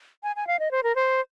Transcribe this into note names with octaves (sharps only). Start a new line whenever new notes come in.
G#5
G#5
F5
D#5
C5
A#4
C5